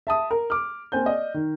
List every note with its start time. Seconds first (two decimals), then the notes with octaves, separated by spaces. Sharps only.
0.07 E5 A5 D#6
0.31 A#4
0.50 D6 F6
0.92 A#3 C4 G#5 G6
1.06 D5 D#5
1.34 D#3